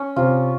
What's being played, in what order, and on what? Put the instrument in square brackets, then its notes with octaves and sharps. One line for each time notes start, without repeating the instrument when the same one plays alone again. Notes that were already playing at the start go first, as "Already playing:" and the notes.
Already playing: [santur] C#4
[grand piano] C3 [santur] F4